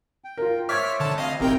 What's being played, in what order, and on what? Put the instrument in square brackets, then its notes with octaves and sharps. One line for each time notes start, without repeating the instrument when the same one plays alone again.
[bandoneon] G5
[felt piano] F4 A#4
[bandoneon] C5 C#5 E5 [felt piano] D6 G#6 A6 [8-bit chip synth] F6 B6
[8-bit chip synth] D3 A5
[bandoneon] D2 C4 B5 [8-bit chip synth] D#5 F5
[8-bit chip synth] G#1 A#4 G5 [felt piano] C4 G4 [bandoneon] D#4 E4